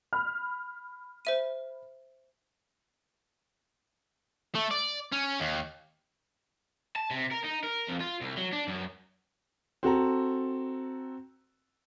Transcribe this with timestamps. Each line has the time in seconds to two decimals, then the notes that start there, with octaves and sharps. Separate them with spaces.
0.13 B5 F6
1.25 C5 E5 D#7
4.55 A3
4.71 D5
5.12 C#4
5.40 D#2
6.96 A5
7.11 C3
7.31 A#4
7.44 D#4
7.64 A#4
7.89 F2
8.01 F4
8.21 C2
8.37 F#3
8.53 D4
8.68 F#2
9.83 C4 F#4 A4 A#5